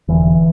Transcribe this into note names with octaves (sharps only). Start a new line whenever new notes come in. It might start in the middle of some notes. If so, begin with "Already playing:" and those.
E1 E2 D3 E3